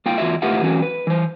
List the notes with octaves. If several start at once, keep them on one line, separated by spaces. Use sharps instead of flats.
A#3 F4 F5 G5
E2 G#2 F4 F#4 E5
A2 F4 G4 B4 E5 F#5
E3 F#3 A3 C#4 F#4
B4
E3 C5